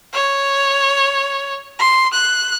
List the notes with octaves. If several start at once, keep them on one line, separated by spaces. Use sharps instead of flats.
C#5
C6
F#6